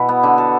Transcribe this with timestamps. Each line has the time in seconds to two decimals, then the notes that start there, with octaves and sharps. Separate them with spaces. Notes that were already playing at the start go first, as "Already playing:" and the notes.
Already playing: B2 E4 F#4
0.09 B3
0.23 D3
0.38 A4